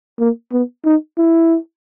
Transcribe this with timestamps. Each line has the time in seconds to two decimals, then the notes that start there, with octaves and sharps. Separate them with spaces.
0.20 A#3
0.52 B3
0.85 D#4
1.18 E4